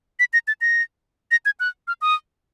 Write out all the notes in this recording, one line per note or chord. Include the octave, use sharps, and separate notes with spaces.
B6
A#6
A6
A#6
A#6
G#6
F#6
F6
D#6